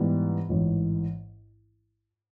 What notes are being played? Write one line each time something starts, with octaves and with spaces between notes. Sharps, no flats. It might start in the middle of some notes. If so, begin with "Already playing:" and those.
Already playing: G#2 E3 G3 B3
A1 G#2 E3